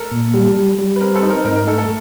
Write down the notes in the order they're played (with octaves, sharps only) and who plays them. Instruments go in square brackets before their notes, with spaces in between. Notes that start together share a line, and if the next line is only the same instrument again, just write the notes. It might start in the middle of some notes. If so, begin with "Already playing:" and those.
Already playing: [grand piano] A4 A#4
[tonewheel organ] A#2
G3
G3
G3
[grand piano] B4
[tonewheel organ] C4 [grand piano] A#4
[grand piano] A4 B4
[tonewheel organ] D#4
[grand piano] A#4
[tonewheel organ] G#2 [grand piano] A#4
[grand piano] A#4
[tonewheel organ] A3 [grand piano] A4
[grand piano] A4